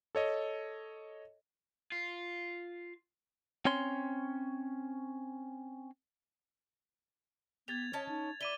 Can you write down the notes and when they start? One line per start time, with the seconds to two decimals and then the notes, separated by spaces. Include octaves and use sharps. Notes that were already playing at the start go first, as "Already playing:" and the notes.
0.15 A4 C#5 D#5
1.92 F4
3.65 C4 C#4 C#5 C6
7.68 B3 G4 G#6 A6 F7
7.93 C#4 C#5 D#5 A5
8.09 D#4
8.41 E4 D5 D6 D#7 G7